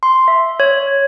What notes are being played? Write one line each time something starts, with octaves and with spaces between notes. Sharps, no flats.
C6
E5
C#5